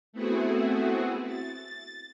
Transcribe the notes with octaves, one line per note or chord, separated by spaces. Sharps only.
A3 B3 C4 E4 F#4 G#4
A6